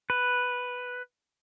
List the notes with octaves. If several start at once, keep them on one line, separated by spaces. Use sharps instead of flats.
B4